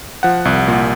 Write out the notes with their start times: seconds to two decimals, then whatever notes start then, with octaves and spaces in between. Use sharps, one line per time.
0.23 F3 F#5
0.45 C2
0.68 A#2